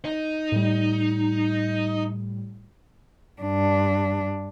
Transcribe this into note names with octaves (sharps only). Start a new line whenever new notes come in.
D#4
A2 G3
G2 D4